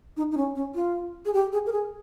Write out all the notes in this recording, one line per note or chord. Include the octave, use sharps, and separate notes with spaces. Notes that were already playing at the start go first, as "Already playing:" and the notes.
D#4
D#4
C#4
C#4
F4
G#4
G4
G#4
A#4
G#4